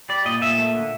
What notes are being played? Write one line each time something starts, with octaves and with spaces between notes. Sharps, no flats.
G3 D5
A#2 D#5
A#2 E5
A3
D3